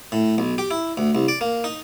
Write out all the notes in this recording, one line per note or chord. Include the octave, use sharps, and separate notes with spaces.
A2
B1
G4
E4
D2
C2
D5
A#3
D#4